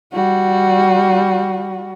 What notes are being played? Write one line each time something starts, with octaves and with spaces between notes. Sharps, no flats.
G3 F#4